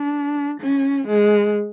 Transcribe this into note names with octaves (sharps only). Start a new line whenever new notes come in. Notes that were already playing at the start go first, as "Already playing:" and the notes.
Already playing: D4
C#4
G#3